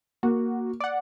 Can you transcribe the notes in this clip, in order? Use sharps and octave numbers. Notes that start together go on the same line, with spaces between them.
A#3 F#4
D5 F#5